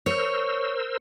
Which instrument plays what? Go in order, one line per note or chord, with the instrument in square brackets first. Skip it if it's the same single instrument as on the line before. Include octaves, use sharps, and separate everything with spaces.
[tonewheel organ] A#4 C5 E6 [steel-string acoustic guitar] C#5